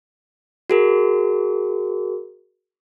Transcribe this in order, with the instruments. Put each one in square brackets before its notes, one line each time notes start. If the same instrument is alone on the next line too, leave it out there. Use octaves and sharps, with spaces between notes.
[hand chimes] F#4 G#4 A#4